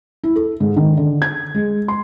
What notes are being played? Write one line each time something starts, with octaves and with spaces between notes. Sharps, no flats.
E4
A4
G#2
D#3
D3
G#6
G#3
C6